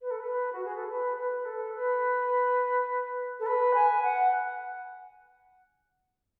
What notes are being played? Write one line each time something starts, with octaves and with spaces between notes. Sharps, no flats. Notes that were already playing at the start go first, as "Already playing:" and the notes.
B4
A4
B4
F#4
G#4
A4
B4
B4
A4
B4
A4
B4
G#5
F#5